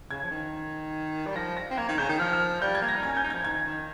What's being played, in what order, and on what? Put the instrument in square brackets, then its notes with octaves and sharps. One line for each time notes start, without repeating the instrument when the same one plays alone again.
[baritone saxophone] C#3 [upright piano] G#6
[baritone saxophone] F3
D#3
G3
[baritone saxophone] F3 [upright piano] A#6
[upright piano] A#6
[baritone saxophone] C4
[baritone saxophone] A#3 [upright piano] G#6
[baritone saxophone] D#3
[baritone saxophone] C#3 [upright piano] G6
[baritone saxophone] D#3
[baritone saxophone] F3 [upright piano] F6
[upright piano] F6
[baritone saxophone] G3 [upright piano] G6
[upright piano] G#6
[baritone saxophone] A#3
[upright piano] A#6
[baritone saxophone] D#4
[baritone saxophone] C#4 [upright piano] G#6
[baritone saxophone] C#4 [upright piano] G6
[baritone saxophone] D#4
[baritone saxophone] F3 [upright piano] G#6
[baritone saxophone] D#3 [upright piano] G#6
[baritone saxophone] D#3